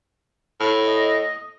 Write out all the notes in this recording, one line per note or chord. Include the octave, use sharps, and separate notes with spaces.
A2
D#5